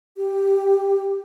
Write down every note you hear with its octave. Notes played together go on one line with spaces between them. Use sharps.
G4